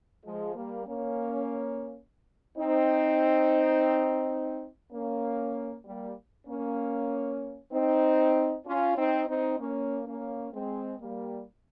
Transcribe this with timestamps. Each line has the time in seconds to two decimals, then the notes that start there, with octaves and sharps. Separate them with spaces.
0.25 F3 G#3
0.55 G3 A#3
0.86 A#3 C#4
2.58 C4 D#4
4.92 A#3 C#4
5.85 G3 A#3
6.47 A#3 C#4
7.72 C4 D#4
8.66 C#4 F4
8.98 C4 D#4
9.29 C4 D#4
9.59 A#3 C#4
10.06 A#3 C#4
10.53 G#3 C4
11.00 G3 A#3